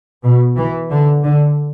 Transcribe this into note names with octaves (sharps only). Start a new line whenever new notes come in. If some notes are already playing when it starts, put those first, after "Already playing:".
B2
E3
D3
D3